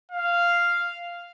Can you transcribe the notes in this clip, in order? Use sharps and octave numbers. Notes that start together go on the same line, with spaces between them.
F5